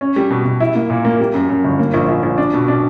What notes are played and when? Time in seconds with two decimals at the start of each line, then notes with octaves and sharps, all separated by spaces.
0.01 C#4
0.16 G3
0.30 B2
0.45 B2
0.60 E4
0.75 A#3
0.90 A#2
1.05 A#3
1.20 G3
1.34 F#2
1.49 F#2
1.64 G1
1.79 A#3
1.94 A#1
2.08 A#1
2.23 A#1
2.38 D4
2.54 B2
2.68 D4